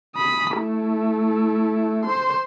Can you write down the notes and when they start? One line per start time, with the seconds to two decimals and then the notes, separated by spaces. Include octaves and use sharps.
0.16 B5 D#6
0.58 A3 E4
2.05 C5 C6